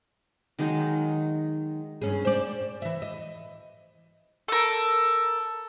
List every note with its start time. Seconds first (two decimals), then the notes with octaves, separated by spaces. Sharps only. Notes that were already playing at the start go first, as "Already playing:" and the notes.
0.59 D#3 F#3 G#3 D#4
2.02 G2 C#4 G#4
2.25 C5 D5
2.82 E3 E5
3.02 D#5
4.48 A4 A#4